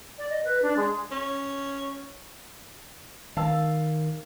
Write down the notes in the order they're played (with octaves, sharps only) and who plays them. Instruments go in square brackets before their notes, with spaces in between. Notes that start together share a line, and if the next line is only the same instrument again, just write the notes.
[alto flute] D5
D#5
B4
D4
G#3
[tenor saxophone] C#4
[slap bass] D#3 [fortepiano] F5 A5 E6